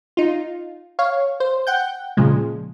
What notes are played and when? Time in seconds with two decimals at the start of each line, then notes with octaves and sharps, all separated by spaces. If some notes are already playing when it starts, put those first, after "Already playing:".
0.17 D#4 F4
0.99 C#5 F5
1.40 C5
1.67 F#5 G5 G6
2.17 A#2 C#3 F3 G#3